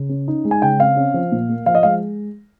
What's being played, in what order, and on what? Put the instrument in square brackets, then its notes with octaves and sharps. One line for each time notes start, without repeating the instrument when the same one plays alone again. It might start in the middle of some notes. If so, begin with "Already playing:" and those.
Already playing: [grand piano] C#3
C#4
D#4
G#3
G#5
C#3 G5
C4 F5
C#4
F3
A#2
A#3
F3 F5
D#5
G#3 F5